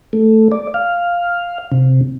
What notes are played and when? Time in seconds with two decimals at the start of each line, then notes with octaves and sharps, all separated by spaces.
0.13 A3
0.52 D5
0.74 F5
1.72 C3